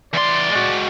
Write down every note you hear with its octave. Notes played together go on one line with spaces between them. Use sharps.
E2 D5 C6
G#3 F#4